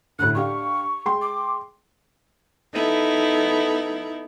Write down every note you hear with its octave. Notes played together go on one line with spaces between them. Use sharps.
D2 A2 F#6
D4 G4 F5 C#6
G#3 G5 C6
D6
B3 D#4 E4 A4